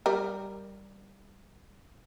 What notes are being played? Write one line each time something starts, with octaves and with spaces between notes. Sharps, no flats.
G3 A#4